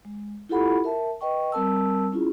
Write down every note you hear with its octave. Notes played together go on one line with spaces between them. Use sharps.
G#3
E4 F4 G4 A4 F#5 B5
A#4 E5 A5
B4 D#5 G5 C#6
G3 C4 A#4 A5 E6
C#4 E4 F4 G#4